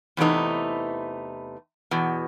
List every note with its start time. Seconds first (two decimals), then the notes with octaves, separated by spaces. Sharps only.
0.17 E2 C3 E3 A3 D#4
1.91 E2 B2